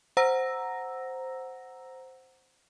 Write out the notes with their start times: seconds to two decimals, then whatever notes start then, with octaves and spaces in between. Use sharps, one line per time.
0.17 C5 F#5 A#5 E6 A#6